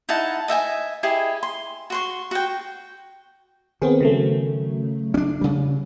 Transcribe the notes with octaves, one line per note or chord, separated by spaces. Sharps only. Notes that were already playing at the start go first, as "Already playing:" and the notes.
D#4 E4 F#5 A5
D#5 E5 G5 G#5
E4 G4 G#4 D#5
C6
F#4 C6 C#6
F#4 G5
D#3 B3 C4 G#4
C#3 F#3 A3
C#4 D4
C#3 G3